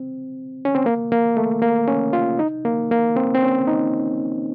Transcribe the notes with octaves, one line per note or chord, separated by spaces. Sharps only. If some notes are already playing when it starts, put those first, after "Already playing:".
Already playing: C4
C#4
C4
A#3
A#3
A3
A#3
C#4
F4
D#4
A#3
A#3
C4
C4
C#4
D#4